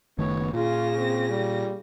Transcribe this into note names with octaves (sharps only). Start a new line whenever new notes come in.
F#1 D#3 A3 B3 C#5
A#2 C#3 F4 A#6
C4
G3